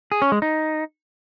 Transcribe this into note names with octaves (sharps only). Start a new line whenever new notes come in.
G#4
C#4
G#3
D#4